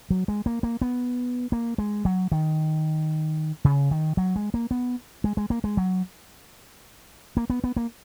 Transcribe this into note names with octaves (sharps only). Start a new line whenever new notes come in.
F#3
G#3
A#3
A#3
B3
A#3
G#3
F#3
D#3
C#3
D#3
F#3
G#3
A#3
B3
G#3
G#3
A#3
G#3
F#3
A#3
B3
B3
A#3